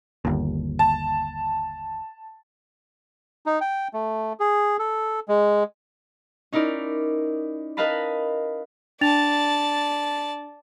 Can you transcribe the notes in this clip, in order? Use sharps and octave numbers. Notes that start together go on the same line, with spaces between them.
G1 D#2
A5
D#4
G5
A3
G#4
A4
G#3
C#4 D#4 E4 A#4 D5
A#4 B4 D#5 F5 A5 B5
D4 D5 A5 A6 F7